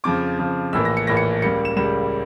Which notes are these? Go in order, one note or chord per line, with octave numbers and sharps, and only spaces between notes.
F2 C#3 F3 D6
F2 C#3 F3
A#1 A2 E3 A#3 E6
A#6
C#7
A#1 A2 E3 A#3 A#6
C#7
C#2 C#3 G3 A#3 C#7
E7
C#2 C#3 G3 A#3 E7